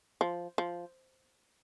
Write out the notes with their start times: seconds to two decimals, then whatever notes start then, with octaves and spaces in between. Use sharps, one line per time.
0.21 F3
0.58 F3